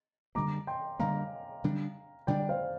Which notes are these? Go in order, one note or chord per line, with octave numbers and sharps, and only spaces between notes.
D3 G3 A#3 A#5 D6
G5 C6
D3 G3 A#3 F5 A#5
D3 G3 D4
D3 G3 D4 D5 G5
C5 F5